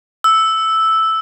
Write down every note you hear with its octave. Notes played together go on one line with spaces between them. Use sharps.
E6